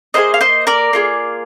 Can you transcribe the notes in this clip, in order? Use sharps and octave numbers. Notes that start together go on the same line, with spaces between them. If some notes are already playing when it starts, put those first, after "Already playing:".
A#3 F4 G#4 C5 D#5
F5
C5 D#5
A#4 D5
A#3 F4 G#4